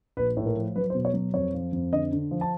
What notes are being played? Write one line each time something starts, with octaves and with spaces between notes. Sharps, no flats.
A#1 B4
A2
A#4
F3
F#3 B4
C5
B2
C#5
F#3
F2 C#5
F3
F2
D3 D#5
D3
F3
A5